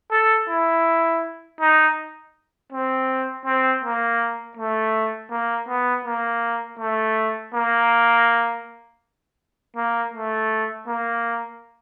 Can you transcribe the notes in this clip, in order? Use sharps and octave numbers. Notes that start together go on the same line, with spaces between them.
A4
E4
D#4
C4
C4
A#3
A3
A#3
B3
A#3
A3
A#3
A#3
A3
A#3